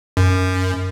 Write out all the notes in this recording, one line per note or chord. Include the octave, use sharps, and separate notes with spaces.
F#2